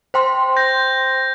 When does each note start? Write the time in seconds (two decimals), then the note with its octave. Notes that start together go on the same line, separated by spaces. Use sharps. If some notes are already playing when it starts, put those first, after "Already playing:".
0.14 C5 G5 C6
0.57 G6 A#6